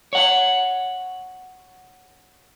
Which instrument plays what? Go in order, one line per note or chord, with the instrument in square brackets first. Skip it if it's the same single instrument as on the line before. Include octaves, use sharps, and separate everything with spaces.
[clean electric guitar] C#5 F#5